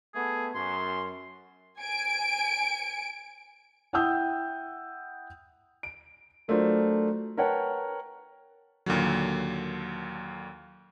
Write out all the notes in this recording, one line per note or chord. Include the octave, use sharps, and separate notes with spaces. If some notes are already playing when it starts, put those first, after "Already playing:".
A3 B3 G#4
F#2 C6
G#5 D7
E4 F#5 G5 D#6 E6 G6
D7
F#3 A3 D4 F4 A#4 C5
A#4 B4 C#5 F#5 G5 A5
D#2 A#2 D3 F#3